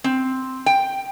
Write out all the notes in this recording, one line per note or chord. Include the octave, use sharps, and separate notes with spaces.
C4
G5